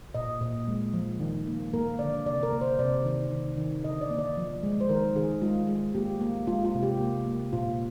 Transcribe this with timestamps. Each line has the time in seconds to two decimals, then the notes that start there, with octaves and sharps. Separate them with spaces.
0.15 A#2 D#5
0.41 A#2
0.68 G#3
0.93 F3
1.20 D#3
1.47 A#3
1.74 A#3 A#4
1.99 D3 D5
2.26 C3 D5
2.43 A#4
2.52 A#3
2.61 C5
2.79 C3 D5
3.05 D#3
3.31 D#3
3.58 D#3
3.84 D3 D#5
4.01 D5
4.10 A#3
4.19 D5
4.37 F3
4.63 G#3
4.81 C5
4.89 D#3 A#4
5.15 D#3 G#4
5.42 G#3 F4
5.68 G#3
5.94 A#3 G4
6.21 A#3
6.47 G#3 F4
6.65 F4
6.75 C3
6.83 G4
7.00 A#3
7.27 A#3
7.53 A#2 F4